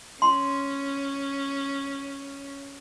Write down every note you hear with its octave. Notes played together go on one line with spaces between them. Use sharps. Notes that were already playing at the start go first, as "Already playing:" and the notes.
C#4 C6